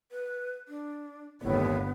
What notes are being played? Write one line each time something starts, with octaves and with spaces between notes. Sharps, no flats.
B4
D4
G1 D#2 A2 B3